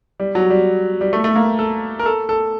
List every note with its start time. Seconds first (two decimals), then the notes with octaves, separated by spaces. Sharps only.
0.20 G3
0.35 F#3
0.50 G3
1.01 G3
1.13 A3
1.24 A3
1.36 A#3
1.59 A4
1.99 A#4
2.06 A4
2.29 A4